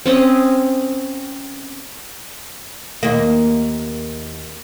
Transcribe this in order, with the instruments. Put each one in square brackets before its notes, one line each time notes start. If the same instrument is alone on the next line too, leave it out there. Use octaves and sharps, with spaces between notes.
[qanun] C4 C#4 D#5
[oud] D#2 A#3